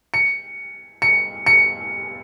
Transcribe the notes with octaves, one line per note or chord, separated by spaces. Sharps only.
C#7
C#7
C#7